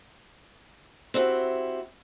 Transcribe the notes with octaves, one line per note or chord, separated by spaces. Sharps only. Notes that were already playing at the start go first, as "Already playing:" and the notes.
C4 E4 F#4 G4